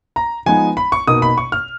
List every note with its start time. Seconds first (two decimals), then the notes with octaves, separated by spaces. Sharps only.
0.16 A#5
0.46 F3 G#3 B3 D#4 G#5
0.77 B5
0.92 C#6
1.07 B2 A#3 D#4 D#6
1.22 B5
1.38 C#6
1.52 F6